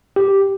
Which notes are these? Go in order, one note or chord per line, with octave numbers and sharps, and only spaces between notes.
G4